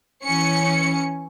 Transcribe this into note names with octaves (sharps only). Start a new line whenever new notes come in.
E3 C#4 C#7